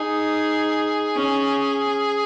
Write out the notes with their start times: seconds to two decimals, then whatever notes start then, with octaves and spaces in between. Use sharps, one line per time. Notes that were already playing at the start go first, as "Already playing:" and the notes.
Already playing: D#4 G#4
1.15 C#4